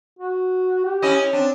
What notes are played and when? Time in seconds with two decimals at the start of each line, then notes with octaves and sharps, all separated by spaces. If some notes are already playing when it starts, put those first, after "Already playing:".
0.19 F#4
0.85 G4
1.02 C#4 E4 D#5
1.33 C4 D4